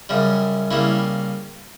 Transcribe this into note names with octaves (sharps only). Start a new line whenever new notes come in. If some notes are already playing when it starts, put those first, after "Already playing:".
F#2 C#3 G3
C#3 G3 A#3 E4